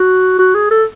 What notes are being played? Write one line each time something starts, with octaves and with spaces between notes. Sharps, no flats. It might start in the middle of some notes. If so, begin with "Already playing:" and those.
Already playing: F#4
F#4
G#4
A4